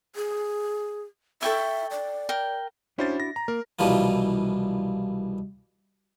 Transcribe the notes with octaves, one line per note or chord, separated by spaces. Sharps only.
G#4
A4 E5 G5 C#6
D5
A#4 G5
C#4 D4 E4 F#4 C5 A6
A#6
A#5
A#3 A#4
C2 B2 E3 F3 G3 A#3